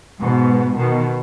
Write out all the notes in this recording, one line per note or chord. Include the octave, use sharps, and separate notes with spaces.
G#2 B2
B2 D#3